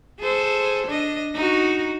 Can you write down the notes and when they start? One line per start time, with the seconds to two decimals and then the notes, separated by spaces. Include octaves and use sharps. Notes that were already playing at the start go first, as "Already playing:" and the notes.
0.20 G#4 A4 C5
0.87 D4 D#5
1.35 D#4 F#4